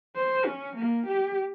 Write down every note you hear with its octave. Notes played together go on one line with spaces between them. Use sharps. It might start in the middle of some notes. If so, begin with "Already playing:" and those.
C5
C#4
A#3
G4